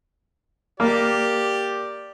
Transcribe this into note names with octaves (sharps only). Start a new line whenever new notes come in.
A#3 G4 D5